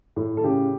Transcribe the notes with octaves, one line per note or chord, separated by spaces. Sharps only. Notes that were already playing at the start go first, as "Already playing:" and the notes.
A2
A4
C#3 G4